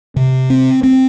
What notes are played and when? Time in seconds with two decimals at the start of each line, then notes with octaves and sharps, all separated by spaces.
0.16 C3
0.50 C4
0.83 C4